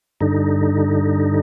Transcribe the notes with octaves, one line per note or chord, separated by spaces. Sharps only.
G2 D3 D#4